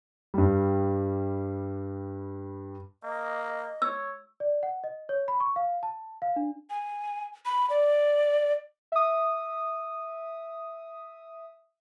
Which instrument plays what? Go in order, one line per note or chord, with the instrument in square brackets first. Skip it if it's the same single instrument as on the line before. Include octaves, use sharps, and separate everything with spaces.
[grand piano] G2 G3
[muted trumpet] A#3 [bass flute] D#5
[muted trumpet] C#5 [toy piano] E6
[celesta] D5
F#5
D#5
C#5
B5
C#6
F5
A5
F5
D4
[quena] G#5
B5
D5
[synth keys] E5 D#6